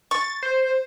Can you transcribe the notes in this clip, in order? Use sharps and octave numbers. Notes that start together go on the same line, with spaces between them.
C#6 A6
C5